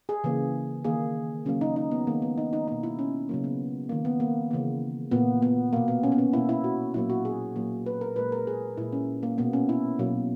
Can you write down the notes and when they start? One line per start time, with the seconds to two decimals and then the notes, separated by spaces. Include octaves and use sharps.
0.09 G#4
0.24 C#3 E3 A#3
0.84 D#3 A#3 G#4
1.45 C#3 F#3 A#3 C#4
1.61 D#4
1.76 D#4
1.91 B3
2.07 D#3 G#3 A#3
2.22 B3
2.38 D#4
2.53 D#4
2.68 B2 A#3 D#4
2.83 E4
2.99 C#4
3.29 C#3 F#3 A#3
3.44 B3
3.89 D#3 A#3
4.05 B3
4.20 A#3
4.51 C#3 E3 A#3
5.11 A#2 A#3 B3
5.42 B3
5.73 B2 A#3
5.88 B3
6.03 C#4
6.12 B3
6.18 C#4
6.33 B2 A#3 E4
6.49 E4
6.64 F#4
6.94 A#2 F#3 A#3 E4
7.10 F#4
7.25 G#4
7.56 A#2 F#3 A#3
7.86 B4
8.01 A#4
8.16 A#2 G#3 B4
8.32 A#4
8.47 G#4
8.77 A#2 G#3 E4
8.93 C#4
9.23 A#3
9.38 B2 A#3 B3
9.53 C#4
9.69 E4
9.99 B2 F#3 A#3